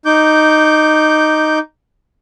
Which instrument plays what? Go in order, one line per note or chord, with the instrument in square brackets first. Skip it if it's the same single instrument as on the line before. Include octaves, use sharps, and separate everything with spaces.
[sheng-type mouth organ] D#4 D6 G6